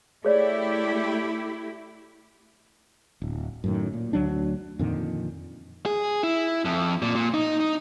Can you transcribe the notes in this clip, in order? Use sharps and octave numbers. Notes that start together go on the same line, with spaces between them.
A3 E4 G4 G#4 C#5 D5
D1
F#2 A2 D#3
A#2
D2 F#3 D4
F2 A#2 D3 D#3
G#4
E4
F2
A#2
A#2
D#4
D#4